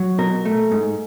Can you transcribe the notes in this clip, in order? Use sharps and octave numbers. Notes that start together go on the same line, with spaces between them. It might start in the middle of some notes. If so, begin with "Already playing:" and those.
Already playing: F#3
B2 A#4
A3
G#2